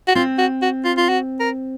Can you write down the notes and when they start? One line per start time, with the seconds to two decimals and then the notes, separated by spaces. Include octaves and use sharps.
0.08 F#4
0.15 C4 F4
0.39 F#4
0.62 F#4
0.85 F4
0.98 F4
1.09 F#4
1.40 A#4